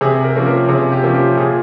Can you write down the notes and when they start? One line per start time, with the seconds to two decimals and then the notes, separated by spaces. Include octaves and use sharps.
0.01 C3 G#4
0.24 A#4
0.35 F3 A#3 C#4
0.46 A#4
0.69 C3 G#4
0.92 G4
1.03 F3 A#3 C#4
1.15 G4
1.37 A#2 G#4